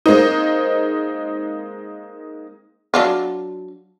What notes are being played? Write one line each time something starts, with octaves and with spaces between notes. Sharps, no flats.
G#3 A#3 C4 D#4
F#3 D4 F4